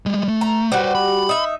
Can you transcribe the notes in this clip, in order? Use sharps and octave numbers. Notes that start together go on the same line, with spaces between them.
G3 G#3
A3
A#5
G3 F#4 B4 C5
B5
D#4 E5